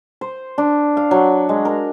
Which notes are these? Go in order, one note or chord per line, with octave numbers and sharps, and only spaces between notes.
C5
D4
F5
F#3
G#3
A#4